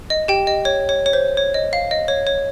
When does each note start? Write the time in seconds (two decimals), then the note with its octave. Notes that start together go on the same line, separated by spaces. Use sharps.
0.10 D#5
0.28 G4 G5
0.47 D#5
0.65 C#5
0.89 C#5
1.06 C#5
1.13 C5
1.37 C#5
1.54 D#5
1.73 F5
1.91 D#5
2.08 C#5
2.27 C#5